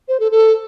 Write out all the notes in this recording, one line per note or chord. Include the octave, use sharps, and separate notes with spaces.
C5
A4
A4